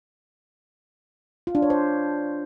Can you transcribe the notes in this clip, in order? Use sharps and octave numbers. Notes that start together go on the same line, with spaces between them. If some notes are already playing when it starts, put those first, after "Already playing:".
F4
D4
C#5
C5